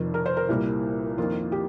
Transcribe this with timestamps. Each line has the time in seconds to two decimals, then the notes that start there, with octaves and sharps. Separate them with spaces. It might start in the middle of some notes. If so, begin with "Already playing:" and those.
Already playing: F1 F2 D#3
0.14 A#4
0.26 C5
0.37 A#4
0.49 C2 A#2 G3 A#3
1.18 F2 D#3 A#3 F4
1.52 G4